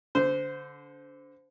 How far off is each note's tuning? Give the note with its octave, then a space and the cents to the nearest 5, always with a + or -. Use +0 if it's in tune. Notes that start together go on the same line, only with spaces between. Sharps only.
D3 -30 C5 -15